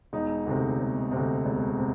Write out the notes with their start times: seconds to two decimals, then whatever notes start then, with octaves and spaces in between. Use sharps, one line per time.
0.13 E1 D#4
0.46 D2 C3
0.79 E1
1.12 D2 C3
1.46 E1
1.79 C3